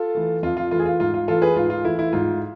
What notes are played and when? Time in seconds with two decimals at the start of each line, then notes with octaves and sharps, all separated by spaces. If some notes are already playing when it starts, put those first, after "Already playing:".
Already playing: F4 A4
0.15 E3 A3
0.43 F2 F4
0.57 F4
0.71 E3 A3 F4
0.79 G#4
0.86 F4
1.00 G#2 F4
1.14 F4
1.28 E3 A3 F4 A4
1.42 G#4 B4
1.56 G#2 F4
1.70 F4
1.85 E3 A3 E4
1.99 E4
2.13 G#2 F4